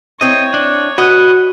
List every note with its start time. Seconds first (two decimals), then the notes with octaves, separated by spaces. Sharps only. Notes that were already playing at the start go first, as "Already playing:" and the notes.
0.21 C4 E4 C#5 D#5
0.54 D4
0.98 F#4 B4 D#5 F#5 F#6